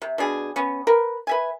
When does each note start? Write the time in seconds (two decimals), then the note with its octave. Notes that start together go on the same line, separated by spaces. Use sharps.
0.02 C3
0.18 B2 D4 G#4
0.56 B3 C#4
0.87 A#4 B4
1.27 B4 E5 G#5